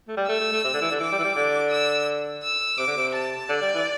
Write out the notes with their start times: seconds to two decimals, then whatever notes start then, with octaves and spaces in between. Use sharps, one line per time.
0.08 A3
0.17 G3
0.28 A3 E6
0.40 A3
0.52 A3
0.64 C3
0.74 D3
0.81 E3
0.91 D3
1.00 E3 D6
1.12 G3
1.19 E3
1.24 G3
1.35 D3
1.71 E6
2.42 E6
2.78 C3 D6
2.87 D3
2.97 C3
3.14 A5
3.49 D3 D5
3.61 G3
3.74 E3